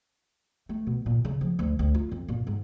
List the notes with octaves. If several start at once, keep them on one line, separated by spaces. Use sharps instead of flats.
A3
B2
A#2
C#3
F3
D2
D2
F4
F2
A#2
G#2